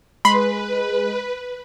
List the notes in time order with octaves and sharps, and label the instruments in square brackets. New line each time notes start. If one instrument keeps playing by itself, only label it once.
[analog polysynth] G#3 [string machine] B4 [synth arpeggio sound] B5 C6